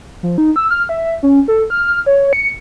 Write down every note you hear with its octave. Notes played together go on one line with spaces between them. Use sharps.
F3
D#4
E6
F6
E5
C#4
A4
F6
C#5
C#7